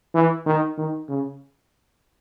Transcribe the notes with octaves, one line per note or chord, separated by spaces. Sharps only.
E3
D#3
D#3
C#3